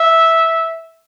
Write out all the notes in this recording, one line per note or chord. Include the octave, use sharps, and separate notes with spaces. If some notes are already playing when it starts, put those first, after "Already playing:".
Already playing: E5